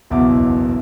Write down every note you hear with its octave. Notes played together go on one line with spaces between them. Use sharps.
F#1 B1 E2 B2 E4 D6